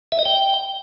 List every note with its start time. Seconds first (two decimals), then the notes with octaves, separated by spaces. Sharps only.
0.12 E5
0.19 D#5
0.26 G5